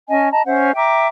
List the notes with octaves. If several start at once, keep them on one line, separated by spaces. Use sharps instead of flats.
C#4 D#5 G#5 A5
D#5 A5 A#5
C#4 C5 E5 F#5
E5 G5 A#5 D6